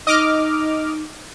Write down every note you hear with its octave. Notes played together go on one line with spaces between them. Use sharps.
D#4 D#5 D6 F6